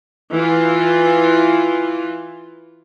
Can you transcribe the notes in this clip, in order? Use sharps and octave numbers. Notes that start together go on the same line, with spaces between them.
E3 F4